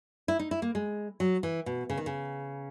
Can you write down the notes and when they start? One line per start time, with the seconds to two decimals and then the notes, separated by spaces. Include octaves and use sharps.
0.28 E4
0.39 D#4
0.51 E4
0.62 A#3
0.75 G#3
1.20 F#3
1.43 E3
1.66 B2
1.90 C#3
1.97 D#3
2.06 C#3